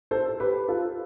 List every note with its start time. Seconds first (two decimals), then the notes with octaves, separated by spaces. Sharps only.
0.11 A4 C5
0.29 C5
0.40 G4 B4
0.68 F4 A4